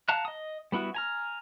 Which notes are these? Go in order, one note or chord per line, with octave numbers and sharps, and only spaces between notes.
F5 F#5 A5 A#5 F#6
D#5 D#6
G3 B3 E4 F#4
G#5 A#5 F6